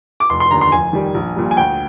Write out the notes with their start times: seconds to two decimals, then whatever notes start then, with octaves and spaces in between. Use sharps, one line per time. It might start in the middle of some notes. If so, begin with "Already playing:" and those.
0.20 D6
0.30 F1 C6
0.40 C6
0.51 D#2 D3 A#5
0.61 C6
0.72 F2 G#5
0.93 D#3 G3
1.14 A#1
1.36 A#2 G3
1.51 G#5
1.57 D2 G5